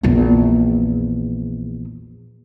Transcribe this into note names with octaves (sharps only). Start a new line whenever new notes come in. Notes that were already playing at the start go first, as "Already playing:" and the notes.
A#1 E2